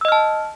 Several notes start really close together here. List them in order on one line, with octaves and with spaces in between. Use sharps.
E6 D#5 F6 A5